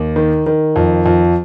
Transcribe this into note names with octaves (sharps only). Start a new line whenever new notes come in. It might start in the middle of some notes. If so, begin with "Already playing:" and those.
Already playing: D#2
D#3
D#3
F2
F2